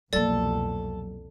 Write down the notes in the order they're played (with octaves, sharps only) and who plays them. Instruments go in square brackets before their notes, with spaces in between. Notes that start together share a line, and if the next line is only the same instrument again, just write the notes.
[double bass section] C2 F2 B2 [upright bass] F#3 A#3 [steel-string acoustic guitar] A4 [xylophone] D5 A6